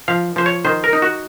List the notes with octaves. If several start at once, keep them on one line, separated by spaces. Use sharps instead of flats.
F3 F5
F3 C5
C#5
D#3 C5
A#4
D#4
F#4